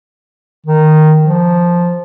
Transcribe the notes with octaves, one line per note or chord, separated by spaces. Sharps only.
D#3
F3